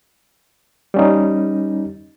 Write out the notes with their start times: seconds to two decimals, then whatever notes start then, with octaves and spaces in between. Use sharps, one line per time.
0.94 G3 C#4 D#4